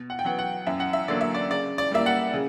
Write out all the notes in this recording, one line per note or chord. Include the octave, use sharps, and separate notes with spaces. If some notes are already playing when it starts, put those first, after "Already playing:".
Already playing: B2
F#5
G5
F#3 B3 F#5
F#5
F#2 E5
F#5
E5
D3 F#3 A#3 D5
E5
D5
C#3 D5
D5
G3 A#3 E5
F#5
C#3